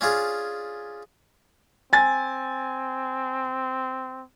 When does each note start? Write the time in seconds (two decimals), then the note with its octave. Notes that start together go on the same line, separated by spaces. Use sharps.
0.01 C#4 D4 F4 G#4
1.93 C4 G#5 A6